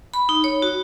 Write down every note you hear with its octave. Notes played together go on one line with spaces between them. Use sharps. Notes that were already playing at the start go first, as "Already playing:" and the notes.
B5
D#4
C#5
F#4